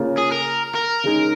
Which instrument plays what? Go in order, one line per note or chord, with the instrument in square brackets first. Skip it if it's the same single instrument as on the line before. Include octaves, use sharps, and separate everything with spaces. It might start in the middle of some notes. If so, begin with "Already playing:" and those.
Already playing: [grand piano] C#3 A#3 C#4 F4
[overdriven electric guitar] G#4
A#4
A#4
[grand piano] C#3 G#3 D#4